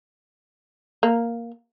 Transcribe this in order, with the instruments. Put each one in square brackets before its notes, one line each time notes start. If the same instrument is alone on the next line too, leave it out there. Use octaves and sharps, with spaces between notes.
[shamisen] A#3